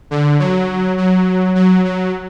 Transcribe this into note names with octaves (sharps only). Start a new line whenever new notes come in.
D3
F#3
F#3
F#3
F#3